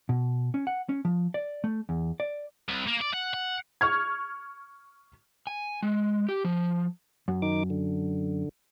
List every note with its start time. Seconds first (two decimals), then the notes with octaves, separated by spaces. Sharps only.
0.09 B2
0.54 C#4
0.67 F#5
0.89 C#4
1.05 F3
1.34 D5
1.64 A3
1.89 E2
2.20 D5
2.68 C2
2.87 A#3
3.01 D5
3.13 F#5
3.34 F#5
3.81 C#6 F6 G#6
5.47 G#5
5.83 G#3
6.29 G4
6.44 F3
7.28 F#2
7.42 D#3 D#4 D6
7.70 D3